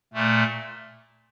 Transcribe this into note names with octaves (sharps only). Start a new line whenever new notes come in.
A#2 A3